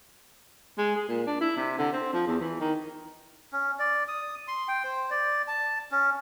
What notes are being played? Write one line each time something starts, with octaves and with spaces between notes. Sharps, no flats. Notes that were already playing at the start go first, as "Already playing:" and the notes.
G#3
G#4
A#2
D4
E4
C3
D3
C4
F3
E2
E3
D#3
C#4
D5
D#6
C6
G5
C5
D5
A5
C#4